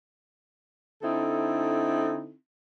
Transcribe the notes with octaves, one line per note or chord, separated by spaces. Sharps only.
D3 C4 D#4 E4 A4